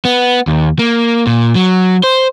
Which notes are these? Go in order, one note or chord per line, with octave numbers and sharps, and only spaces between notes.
B3
D#2
A#3
A#2
F#3
C5